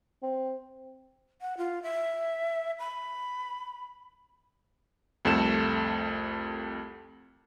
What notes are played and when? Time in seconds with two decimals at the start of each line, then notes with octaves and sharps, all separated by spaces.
0.23 C4
1.41 F#5
1.58 F4
1.83 E5
2.79 B5
5.25 C2 F2 A3 A4 E7